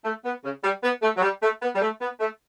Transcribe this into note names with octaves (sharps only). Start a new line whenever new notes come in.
A3
B3
C#3
G3
B3
A3
F#3
G3
A3
B3
G3
A3
B3
A3